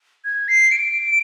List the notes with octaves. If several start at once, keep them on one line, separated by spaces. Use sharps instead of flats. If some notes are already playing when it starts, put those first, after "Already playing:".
G#6
C7
D7